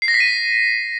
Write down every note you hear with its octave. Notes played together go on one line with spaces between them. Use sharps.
C7
A#6
B6
D#7